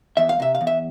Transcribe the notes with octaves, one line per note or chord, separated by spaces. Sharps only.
E2 E5
F5
C3 E5
F5
E2
E5